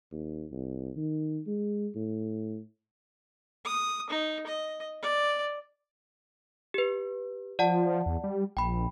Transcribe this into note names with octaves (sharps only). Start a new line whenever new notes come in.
D#2
C2
D#3
G#3
A2
D#6
D#4
D#5
D5
G4 B4
F3 D5 F#5 A5
E2
G3
A#1 G5 B5